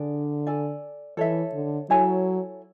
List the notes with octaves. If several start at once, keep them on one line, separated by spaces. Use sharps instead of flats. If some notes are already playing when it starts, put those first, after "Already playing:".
Already playing: D3 D4 G#4 D5
A4 D5 G#5
E3 A4 C#5 E5
D3
F#3 E4 A4 C#5 G#5